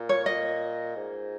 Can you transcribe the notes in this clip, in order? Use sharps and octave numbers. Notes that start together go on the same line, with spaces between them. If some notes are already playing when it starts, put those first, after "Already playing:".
Already playing: A#2
C#5
D#5
G#2